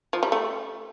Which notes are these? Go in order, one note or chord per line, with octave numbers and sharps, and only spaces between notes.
F3
G3
A3